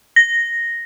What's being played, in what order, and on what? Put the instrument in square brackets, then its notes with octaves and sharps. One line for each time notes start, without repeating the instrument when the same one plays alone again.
[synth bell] A#6